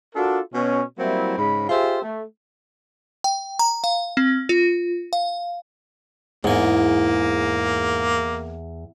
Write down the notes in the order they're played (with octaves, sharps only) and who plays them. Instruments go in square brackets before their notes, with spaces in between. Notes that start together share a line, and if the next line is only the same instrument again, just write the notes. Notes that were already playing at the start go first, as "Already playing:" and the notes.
[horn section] D4 F4 F#4 A4 A#4 D5
B2 C#4
F#3 G3 A#3 C4 E4
G#2 C#3 B5
F4 G4 G#4 C5 E5
A3
[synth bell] G5
A#5
F5
C4
F4
F5
[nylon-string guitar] E2 [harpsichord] G#2 G#5 [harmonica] A#3